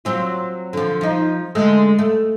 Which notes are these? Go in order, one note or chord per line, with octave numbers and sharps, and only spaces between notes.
F#3 C4 F4
D3 F3
F3 D#4
D3 G#3 A3
A3